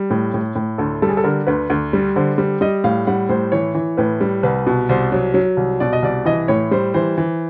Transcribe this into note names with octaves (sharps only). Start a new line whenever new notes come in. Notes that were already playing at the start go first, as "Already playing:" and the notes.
Already playing: G3
A2
A2
A2
D2 A4
G3 A4
G#4
A4
D3 A#4
D2 B4
D2
G3
D3 C5
G3
G3 D#5
A2 F5
G3 F#5
A2 C5
E3 C#5
E3
A2 B4
G3
C2 B4
B2
C2 C5
F#3
F#3
C2
B2 D5
D#5
C2 D5
E3 D#5
A2 C#5
G3 C5
E3 C5
E3